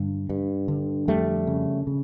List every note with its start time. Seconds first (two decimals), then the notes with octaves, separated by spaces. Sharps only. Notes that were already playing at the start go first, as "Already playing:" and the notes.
Already playing: G2 D3
0.29 G2
0.68 D3
1.08 F2 G3 A3
1.47 C#3
1.87 C#3